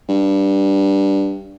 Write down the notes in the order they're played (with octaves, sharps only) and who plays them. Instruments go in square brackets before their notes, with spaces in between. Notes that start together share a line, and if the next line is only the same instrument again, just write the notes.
[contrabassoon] G2